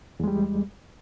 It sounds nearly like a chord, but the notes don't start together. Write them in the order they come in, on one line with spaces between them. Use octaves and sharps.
E2 G#3 G3